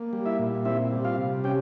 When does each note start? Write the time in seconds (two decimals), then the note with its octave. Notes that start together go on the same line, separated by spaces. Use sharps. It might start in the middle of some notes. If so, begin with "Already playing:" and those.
Already playing: A#3
0.13 G3
0.25 E4 E5
0.39 A#2
0.65 C4 E4 E5
0.92 G3
1.05 F4 F5
1.18 C3
1.44 C#4 G4 G5